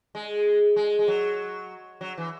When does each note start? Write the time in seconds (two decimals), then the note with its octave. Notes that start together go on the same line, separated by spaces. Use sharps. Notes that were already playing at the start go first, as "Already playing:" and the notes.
0.15 G#3
0.76 G#3
0.99 G#3
1.08 F#3
2.01 F#3
2.18 E3